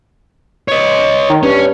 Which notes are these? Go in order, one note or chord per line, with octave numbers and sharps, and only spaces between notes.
C#5 D#5
D#3
G2 C#4